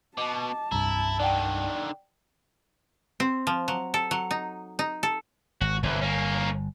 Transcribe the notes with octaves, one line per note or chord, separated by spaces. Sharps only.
B2 D#5 A5 D6
C2 G2 E4 A#5
D3 D#3 D5 F#5 G5
C4
F3
F#3
A4
F#3
D#4
D#4
A4
G#1 F#4
G1 C2 E3
A#3 C#4